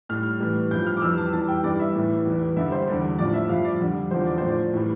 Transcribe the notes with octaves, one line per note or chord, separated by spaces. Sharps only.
A2 G3 F6
A2 E3 G3
G2 F3 G6
F6
D6
F2 E3 G3 E6
A5
E2 E3 G3 A5
G5
G2 E3 G3 D5
E5
A2 E3 G3
E2 E3 G3
G2 D3 G3 E5
C5
E2 D3 G3
A2 F3 D5
E5
G2 F3 F5
D5
F2 D3 G3
E2 D3 F3 C5
D5
A2 F3 C5
D5
A2 E3 G3